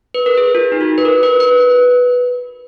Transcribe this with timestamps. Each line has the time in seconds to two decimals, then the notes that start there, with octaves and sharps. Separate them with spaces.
0.14 B4
0.26 A#4
0.37 G#4
0.55 F4
0.72 D#4
0.81 F#4
0.98 B4
1.05 A#4
1.23 B4
1.40 B4